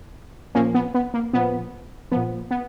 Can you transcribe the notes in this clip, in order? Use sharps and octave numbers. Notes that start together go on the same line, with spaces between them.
A#2 F3 A#3 C#4
B3
B3
A#3
A#2 F3 B3
A#2 F3 B3
B3